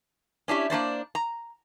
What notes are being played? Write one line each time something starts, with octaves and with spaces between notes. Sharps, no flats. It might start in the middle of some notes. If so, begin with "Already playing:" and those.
C#4 D4 E4 G4
A#3 D4 C5 D5
A#5